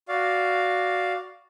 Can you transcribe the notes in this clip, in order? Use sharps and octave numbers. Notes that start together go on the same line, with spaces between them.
F#4 D5 F5